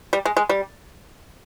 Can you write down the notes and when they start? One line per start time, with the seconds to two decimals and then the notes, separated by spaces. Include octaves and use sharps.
0.13 G3
0.25 G#3
0.37 G#3
0.49 G3